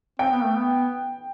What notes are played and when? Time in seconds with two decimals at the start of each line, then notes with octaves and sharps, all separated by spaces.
0.19 C4 G5
0.31 B3
0.44 A3
0.56 B3